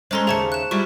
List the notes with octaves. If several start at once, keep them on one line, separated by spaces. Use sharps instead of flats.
G#3 C#4 A4 C5 A#5 C6
D#2 C#3 G#4 E5 A5 C#7
F#6 E7
G3 E4 F4 C#6